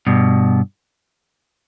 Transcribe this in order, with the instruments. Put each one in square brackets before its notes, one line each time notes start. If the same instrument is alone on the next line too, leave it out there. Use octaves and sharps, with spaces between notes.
[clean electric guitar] G2 B2